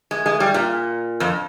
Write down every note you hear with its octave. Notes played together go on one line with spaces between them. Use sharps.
G#3
G#3
G3
A#2
F2